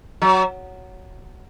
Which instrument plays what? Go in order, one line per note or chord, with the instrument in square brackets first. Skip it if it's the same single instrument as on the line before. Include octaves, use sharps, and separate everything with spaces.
[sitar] F#3